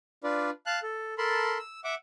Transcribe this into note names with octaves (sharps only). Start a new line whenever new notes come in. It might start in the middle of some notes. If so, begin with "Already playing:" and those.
D4 F4 B4 D5
F5 A5 F#6
A4
A4 A#4 A5 B5 C6
E6
E5 F#5 D6